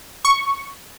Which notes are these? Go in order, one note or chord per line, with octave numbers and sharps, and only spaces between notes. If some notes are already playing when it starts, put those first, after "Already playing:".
C#6